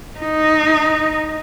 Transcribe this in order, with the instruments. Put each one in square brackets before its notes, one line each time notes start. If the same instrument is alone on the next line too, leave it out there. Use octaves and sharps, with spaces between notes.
[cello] D#4